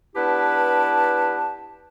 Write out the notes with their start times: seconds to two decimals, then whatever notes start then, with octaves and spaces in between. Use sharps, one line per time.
0.16 B3 D4 E4 G4 B4 A5